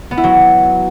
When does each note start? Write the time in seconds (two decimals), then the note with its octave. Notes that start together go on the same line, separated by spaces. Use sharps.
0.11 B3
0.17 E4
0.24 F#3